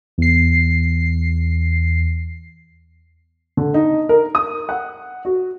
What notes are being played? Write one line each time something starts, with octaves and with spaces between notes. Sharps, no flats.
E2 C7
D3
D#4
A#4
D#6
F#5
F#4